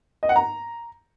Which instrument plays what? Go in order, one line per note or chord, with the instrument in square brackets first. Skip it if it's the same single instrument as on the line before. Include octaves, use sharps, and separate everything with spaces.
[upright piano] D#5
F#5
A#5